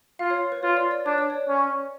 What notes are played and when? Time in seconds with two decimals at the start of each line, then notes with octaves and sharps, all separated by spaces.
0.19 F4 F5
0.30 C#5
0.52 B4
0.63 F4 C#5
0.77 D5
0.91 D5
1.06 D4 C#5
1.18 D5
1.30 C#5
1.48 C#4